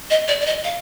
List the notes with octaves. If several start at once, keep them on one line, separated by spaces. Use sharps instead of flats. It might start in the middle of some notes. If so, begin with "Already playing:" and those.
D#5
D5
D5
D#5
F5